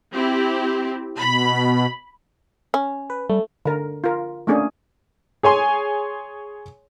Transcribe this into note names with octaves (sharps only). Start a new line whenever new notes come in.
C4 E4 G4
B2 B5
C#4
B4
G3 A3
D3 A#4
F4 A#4
A3 A#3 C#4 D4 G#4
G#4 C#5 G#5 C6